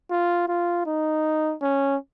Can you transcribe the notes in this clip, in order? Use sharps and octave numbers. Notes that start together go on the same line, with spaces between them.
F4
F4
D#4
C#4